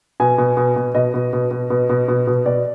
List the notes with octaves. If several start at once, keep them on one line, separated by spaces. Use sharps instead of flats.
B2 G#5
B2
B2
B2
B2 D#5
B2
B2
B2
B2
B2
B2
B2
B2 D5